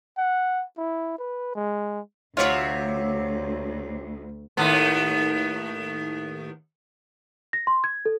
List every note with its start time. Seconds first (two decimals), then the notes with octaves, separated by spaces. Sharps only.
0.17 F#5
0.78 E4
1.18 B4
1.55 G#3
2.37 D2 C3 F#3 F4 C#5 E5
4.57 D#2 A2 B3
7.53 A#6
7.67 C6
7.84 G#6
8.06 A4